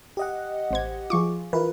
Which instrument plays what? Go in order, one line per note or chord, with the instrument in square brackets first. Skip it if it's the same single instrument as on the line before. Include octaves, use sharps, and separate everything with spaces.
[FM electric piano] G4 D#5 F#5
[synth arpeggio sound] A1 C5 G#6
[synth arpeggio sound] F3 C#6 D6 [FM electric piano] F4 G#4
[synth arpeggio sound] E3 [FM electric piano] F4 A#4 B4